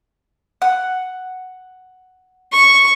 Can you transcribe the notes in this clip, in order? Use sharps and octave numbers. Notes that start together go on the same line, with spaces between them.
F#5
C#6